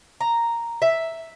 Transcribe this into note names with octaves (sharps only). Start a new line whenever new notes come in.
A#5
E5